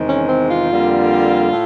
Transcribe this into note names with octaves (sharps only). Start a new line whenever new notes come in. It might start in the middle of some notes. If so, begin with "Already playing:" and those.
Already playing: E2 C3 D#3 G#3
C#4
C4
F4
F2 D3 G3 A#3
A2